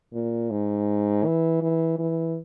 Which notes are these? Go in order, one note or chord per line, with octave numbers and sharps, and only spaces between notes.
A#2
G#2
E3
E3
E3